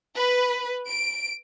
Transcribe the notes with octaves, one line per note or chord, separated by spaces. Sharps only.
B4
D7